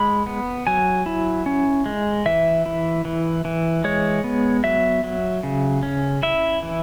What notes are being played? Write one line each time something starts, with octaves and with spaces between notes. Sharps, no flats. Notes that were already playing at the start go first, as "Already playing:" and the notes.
Already playing: G#3 B5
B3
F#3 G#5
E4
C#4
G#3
E3 E5
E4
E3
E3
G#3 C#5
B3
F#3 E5
F#3
C#3
C#4
E4 E5
E3